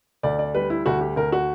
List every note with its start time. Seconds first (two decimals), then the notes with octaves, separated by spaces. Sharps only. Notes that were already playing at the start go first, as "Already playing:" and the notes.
0.23 D2 D5
0.39 D5
0.55 G3 B4
0.70 E4
0.86 D2 F#4
1.01 G4
1.16 D2 A#4
1.32 F#4